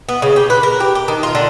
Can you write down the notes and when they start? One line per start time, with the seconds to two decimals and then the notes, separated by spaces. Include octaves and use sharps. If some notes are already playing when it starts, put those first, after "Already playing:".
0.09 B3
0.22 C#3
0.36 G4
0.50 B4
0.63 A#4
0.80 G4
0.95 G4
1.08 D#3
1.23 F4
1.35 D3